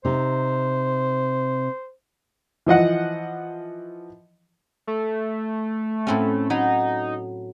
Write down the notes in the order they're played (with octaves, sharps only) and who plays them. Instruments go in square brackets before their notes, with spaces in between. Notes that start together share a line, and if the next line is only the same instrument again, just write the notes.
[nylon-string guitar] C3 D#4 [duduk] C5
[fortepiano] E3 F3 D#5 F#5
[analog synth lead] A3
[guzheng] A2 C4 C#4
[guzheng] F#3 B5 [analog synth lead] D#4